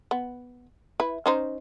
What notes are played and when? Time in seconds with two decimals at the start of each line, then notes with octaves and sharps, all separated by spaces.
0.11 B3
1.00 E4 B4
1.26 C#4 D#4 C5